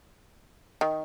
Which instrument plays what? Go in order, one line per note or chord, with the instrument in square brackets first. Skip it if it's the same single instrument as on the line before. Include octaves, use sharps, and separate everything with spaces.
[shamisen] D#3